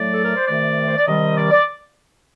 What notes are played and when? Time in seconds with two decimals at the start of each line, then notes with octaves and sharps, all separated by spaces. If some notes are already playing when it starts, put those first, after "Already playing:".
Already playing: A2 F#3 A3 D5
0.12 A4
0.24 A#4
0.36 C5
0.47 C3 D#3 A3 D5
0.88 C5
0.97 D5
1.06 C3 D#3 G3 D#5
1.37 D5
1.51 D5